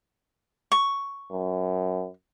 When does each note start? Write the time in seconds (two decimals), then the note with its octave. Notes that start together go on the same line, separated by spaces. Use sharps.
0.72 C#6
1.31 F#2